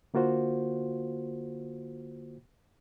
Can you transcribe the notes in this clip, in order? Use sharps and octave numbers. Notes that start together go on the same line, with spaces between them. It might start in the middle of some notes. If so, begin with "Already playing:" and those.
D3 A#3 F4 F#4 C5